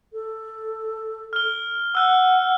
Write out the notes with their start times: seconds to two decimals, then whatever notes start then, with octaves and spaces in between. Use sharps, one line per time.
0.13 A4
1.33 F6 G7
1.95 F#5 E6 F#6